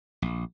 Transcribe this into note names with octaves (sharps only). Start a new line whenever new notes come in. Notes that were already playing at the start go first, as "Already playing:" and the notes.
A#1